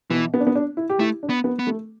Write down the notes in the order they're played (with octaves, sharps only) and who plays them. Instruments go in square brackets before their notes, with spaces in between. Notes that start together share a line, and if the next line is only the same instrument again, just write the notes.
[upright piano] B2 [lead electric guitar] E3
[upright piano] B3
D4
B3
D4
E4
G4
[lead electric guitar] A3 [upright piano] E4
[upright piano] D4
[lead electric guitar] B3
[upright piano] B3
[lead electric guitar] B3
[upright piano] A3